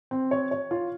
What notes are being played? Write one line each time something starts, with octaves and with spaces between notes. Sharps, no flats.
C4
C#5
C#5
F4